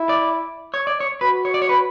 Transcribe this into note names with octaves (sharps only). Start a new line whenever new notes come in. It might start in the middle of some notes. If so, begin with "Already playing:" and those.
Already playing: E4
D5
C#5
D5
C#5
F#4 B4
C#5
D5
C#5
B4